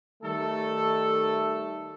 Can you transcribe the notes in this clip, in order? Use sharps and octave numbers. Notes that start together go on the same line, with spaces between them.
D#3 G3 A3 A4